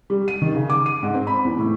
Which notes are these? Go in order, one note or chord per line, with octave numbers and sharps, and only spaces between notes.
G3
D#7
D#3
C#3
D6
D#7
G#2
C4
B5
E2
A2